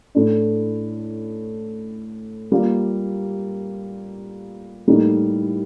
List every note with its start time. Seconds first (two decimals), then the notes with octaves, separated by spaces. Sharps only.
0.15 A2 A3 D4
2.52 G3 A#3 F4
4.88 A2 G3 A#3 D#4